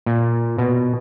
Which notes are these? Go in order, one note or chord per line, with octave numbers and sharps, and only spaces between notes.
A#2
B2